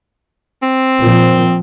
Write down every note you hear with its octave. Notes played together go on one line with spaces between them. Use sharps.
C4
A#2 F3